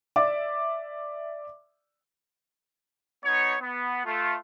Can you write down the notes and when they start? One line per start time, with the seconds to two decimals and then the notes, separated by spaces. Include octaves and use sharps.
0.16 D5 E5 D6
3.25 B3 D#4 C#5
3.62 B3
4.05 A3 F4